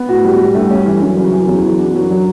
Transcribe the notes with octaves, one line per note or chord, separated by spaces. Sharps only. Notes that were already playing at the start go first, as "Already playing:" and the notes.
Already playing: B3
A2 F#4
G3
G3
G2 A3
C#4
E3
F#2 C#4
C#3
E3
E2 F#3
F#3
D4
F#2 F#3
F#3